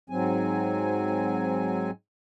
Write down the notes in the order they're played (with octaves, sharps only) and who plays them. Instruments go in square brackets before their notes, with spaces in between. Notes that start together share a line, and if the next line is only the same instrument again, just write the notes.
[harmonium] G#2 F#3 C4 G#5